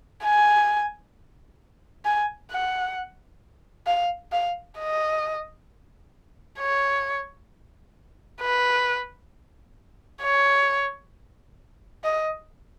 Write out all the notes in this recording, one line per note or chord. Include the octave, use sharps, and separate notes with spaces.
G#5
G#5
F#5
F5
F5
D#5
C#5
B4
C#5
D#5